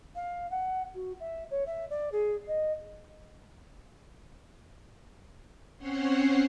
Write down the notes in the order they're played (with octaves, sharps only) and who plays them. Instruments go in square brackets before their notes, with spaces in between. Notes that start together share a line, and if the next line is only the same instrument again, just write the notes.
[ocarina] F5
F#5
F#4
E5
C#5
E5
D5
G#4
D#5
[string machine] C4 C#4 C5 C#5 F#5 C6